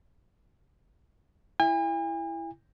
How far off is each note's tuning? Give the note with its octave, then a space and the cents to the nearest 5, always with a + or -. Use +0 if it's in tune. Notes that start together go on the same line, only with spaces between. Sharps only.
E4 +10 G#5 -45